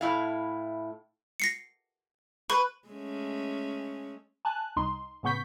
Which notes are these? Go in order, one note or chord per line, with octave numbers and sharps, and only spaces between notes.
A2 E4 F5
A#6 C7 C#7
B4 C#6
G#3 A3 C#4
G#5 A5 F#6
C2 D#4 C6
A2 C#3 B3 C#6 G6 B6